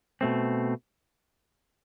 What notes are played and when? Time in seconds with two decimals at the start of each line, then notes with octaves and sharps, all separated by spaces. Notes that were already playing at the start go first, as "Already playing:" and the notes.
0.21 B2 A3 C4